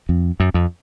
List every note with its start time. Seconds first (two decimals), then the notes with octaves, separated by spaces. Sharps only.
0.09 F2
0.40 F#2
0.54 F2